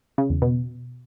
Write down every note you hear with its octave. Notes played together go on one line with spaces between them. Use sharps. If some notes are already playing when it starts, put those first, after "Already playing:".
C#3
E2
B2